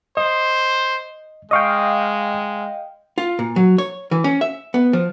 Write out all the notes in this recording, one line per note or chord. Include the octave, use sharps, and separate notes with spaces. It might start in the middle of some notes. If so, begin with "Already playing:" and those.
C5 D#5
G#3 D#5 F5 G5 C#6 D#6
F4
A#2
F#3
C#5
E3
C#4
E5
B3
F3